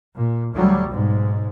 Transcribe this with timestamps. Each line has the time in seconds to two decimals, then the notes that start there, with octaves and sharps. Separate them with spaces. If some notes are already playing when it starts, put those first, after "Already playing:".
0.13 A#2
0.52 D2 F#3 G3
0.87 B1 G#2